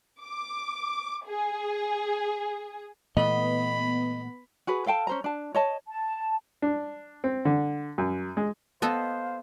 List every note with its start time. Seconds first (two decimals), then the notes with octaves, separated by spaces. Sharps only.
0.21 D6
1.26 G#4
3.17 A#2 E3 A3 B3 D#5 B5
4.67 F#4 G#4 B4
4.86 A4 F5 G5 A5
5.07 C#4 C5 A#5
5.24 D4 A5
5.55 C#5 D#5 A5
5.88 A5
6.62 D4
7.24 C4
7.45 D3
7.98 F#2
8.37 G#3
8.82 B3 A4 C5 D#5 F5